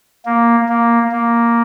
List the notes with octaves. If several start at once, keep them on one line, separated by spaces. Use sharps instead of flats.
A#3
A#3
A#3